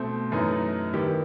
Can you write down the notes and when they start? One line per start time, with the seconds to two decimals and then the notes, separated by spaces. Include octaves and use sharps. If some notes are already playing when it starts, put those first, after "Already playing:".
Already playing: B2 A3 C4
0.32 F#2 E3 A3 D#4
0.93 D#3 G3 B3 E4 G4